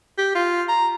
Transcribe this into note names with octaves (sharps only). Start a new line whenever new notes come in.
G4
F4
A#5